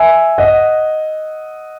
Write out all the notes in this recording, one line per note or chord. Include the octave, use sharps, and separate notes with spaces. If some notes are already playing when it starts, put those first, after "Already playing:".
Already playing: E5 G#5
D#5 F#5